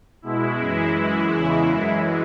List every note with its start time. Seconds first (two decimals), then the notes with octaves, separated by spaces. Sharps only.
0.22 B2 G#3 E4
0.59 F#2 E3 G#3
0.96 F#2 E3 G#3 E4
1.34 E2 C#3 E3 G#3
1.69 F#2 E3 G#3